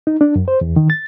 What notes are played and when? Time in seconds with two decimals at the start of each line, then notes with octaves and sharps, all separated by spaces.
0.07 D#4
0.21 D4
0.36 F#2
0.48 C5
0.61 E2
0.76 D#3
0.90 A6